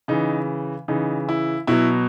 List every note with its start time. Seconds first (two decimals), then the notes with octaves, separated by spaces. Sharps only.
0.08 C#3 E3 D#4
0.88 C#3 E3 D#4
1.29 E4
1.67 B2 F#3 E4